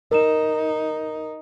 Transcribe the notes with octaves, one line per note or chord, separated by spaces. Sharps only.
D#4 A#4 E7